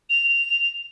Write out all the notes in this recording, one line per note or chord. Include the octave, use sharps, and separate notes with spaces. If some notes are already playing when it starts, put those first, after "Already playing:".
F7